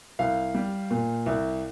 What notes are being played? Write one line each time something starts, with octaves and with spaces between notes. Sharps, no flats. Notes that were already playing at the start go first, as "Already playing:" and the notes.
C2 F5
G3
A#2
C2